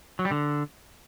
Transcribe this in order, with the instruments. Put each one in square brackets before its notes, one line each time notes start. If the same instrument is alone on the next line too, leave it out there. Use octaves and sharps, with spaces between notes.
[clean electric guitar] F#3
G3
D3